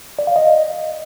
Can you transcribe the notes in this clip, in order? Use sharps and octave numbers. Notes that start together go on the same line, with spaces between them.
D5
F5
D#5